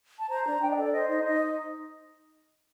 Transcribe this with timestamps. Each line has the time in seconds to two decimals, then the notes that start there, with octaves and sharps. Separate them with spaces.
0.18 A5
0.30 C5 A#5
0.45 D4 A#5
0.61 D4 G5
0.71 D#5
0.78 A4
0.83 D5
0.93 C5 D#5
1.08 D#4 D#5
1.24 D#4 D#5